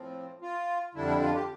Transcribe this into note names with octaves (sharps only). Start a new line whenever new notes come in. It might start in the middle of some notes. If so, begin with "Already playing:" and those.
Already playing: A2 F3 C4
F4
F2 D3 G3 D4 E4
E4
F4
G4